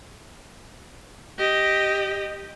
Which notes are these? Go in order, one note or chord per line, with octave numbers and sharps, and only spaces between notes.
G4 D#5